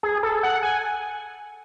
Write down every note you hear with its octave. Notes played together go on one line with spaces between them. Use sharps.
G#4
A4
F#5
G#5